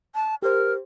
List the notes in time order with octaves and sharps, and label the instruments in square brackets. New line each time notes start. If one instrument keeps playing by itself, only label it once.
[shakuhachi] A5
[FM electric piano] G4 C5 [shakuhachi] A#4